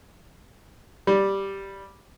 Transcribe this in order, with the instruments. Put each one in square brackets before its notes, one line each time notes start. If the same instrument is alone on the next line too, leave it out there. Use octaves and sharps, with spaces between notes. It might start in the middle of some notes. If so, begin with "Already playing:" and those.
[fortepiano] G3